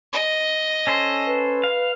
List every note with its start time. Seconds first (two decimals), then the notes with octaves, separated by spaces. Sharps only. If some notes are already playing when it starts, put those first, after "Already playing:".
0.13 D#5
0.87 C#4 A4 C5
1.27 B4
1.64 F5